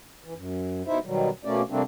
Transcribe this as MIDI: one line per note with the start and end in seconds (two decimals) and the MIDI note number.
0.24 0.34 52
0.36 0.82 42
0.87 0.99 47
0.87 0.99 63
0.87 0.99 64
0.87 0.99 72
0.87 0.99 76
1.05 1.29 47
1.05 1.29 51
1.05 1.29 54
1.05 1.29 55
1.45 1.62 47
1.45 1.62 57
1.45 1.62 58
1.45 1.62 61
1.45 1.62 74
1.70 1.82 48
1.70 1.82 55
1.70 1.82 57
1.70 1.82 58
1.70 1.82 60
1.70 1.82 62